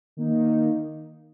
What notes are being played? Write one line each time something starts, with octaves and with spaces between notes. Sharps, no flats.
D#3 A#3 D#4